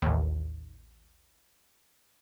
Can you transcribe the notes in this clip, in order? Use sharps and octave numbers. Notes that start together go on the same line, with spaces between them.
A1 D#2